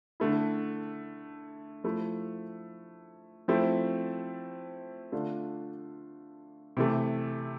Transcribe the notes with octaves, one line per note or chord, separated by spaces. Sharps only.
D3 A3 E4
F3 A3 E4
F3 A3 C4 E4
D3 A3 D4 F4
C3 E3 A3